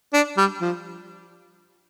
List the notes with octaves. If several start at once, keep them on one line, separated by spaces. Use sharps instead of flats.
D4
G3
F3